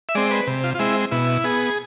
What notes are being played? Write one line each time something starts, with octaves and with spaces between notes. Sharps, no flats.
E5
G#3 C4 D5
B4
C3
F4
F4
G#3 C4 E4
B2 E4
B3 G#4